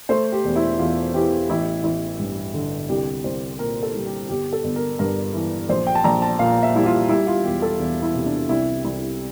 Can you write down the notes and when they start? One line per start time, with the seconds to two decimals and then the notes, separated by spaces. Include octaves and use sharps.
0.09 A3 C5
0.32 G4
0.44 E1
0.56 E4
0.79 E2 F4
1.14 E3 G4
1.49 A1 E4
1.84 A1 E4
2.19 G2
2.54 D3
2.89 C2 G4
3.24 C2 C5
3.59 A#2 A#4
3.83 A4
3.94 G3
4.06 G4
4.29 G1 G4
4.53 A4
4.64 G1
4.76 A#4
4.99 G2 A#4
5.34 E3
5.69 A#1 C5
5.87 G5
5.95 A5
6.04 A#1 A#5
6.22 A5
6.39 A#2 F5
6.63 E5
6.75 G3 E4
6.86 F4
7.09 G3 E4
7.27 F4
7.44 E1 G4
7.62 A4
7.79 E2
8.02 E4
8.14 C3
8.26 D4
8.49 C2 E4
8.84 C2 E4